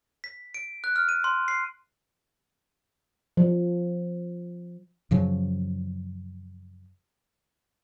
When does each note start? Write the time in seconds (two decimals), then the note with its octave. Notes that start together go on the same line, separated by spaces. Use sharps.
0.24 B6
0.54 D7
0.84 F#6
0.96 F6
1.09 D#7
1.24 C6
1.48 C7
3.37 F3
5.11 F#2 C#3 F3 F#3